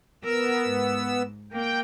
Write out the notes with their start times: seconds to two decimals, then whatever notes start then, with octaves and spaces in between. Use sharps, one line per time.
0.24 B3 A#4 E6
0.66 G#2
1.52 A#3 G5